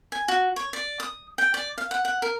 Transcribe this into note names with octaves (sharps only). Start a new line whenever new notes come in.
G#5
F#4
C#5
D5
D#6
G5
D5
F5
F#5
F#5
A#4